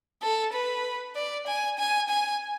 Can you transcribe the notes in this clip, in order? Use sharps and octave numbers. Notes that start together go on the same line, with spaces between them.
A4
B4
D5
G#5
G#5
G#5